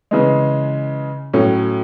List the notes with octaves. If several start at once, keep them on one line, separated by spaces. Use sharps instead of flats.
C#3 E3 G#3
A2 F#3 C#4